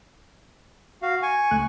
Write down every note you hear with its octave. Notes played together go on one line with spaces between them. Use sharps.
F#4 F5
G#5 C#6
C#2 A3 F#6